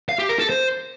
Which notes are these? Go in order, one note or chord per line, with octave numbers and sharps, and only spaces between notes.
F5
G4
A#4
A4
C5